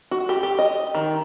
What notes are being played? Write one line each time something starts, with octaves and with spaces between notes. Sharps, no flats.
F#4
G4
G4
D#5
D#3